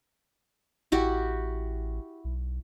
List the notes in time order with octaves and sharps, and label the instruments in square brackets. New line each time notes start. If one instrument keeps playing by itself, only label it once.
[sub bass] A1 [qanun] E4 F#4 G4
[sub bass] B1